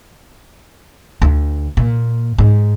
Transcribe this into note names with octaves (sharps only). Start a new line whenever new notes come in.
D2
A#2
G#2